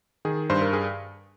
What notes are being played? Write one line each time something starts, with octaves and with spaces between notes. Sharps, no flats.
D#3 G#4
G2 C5
A#4
G#4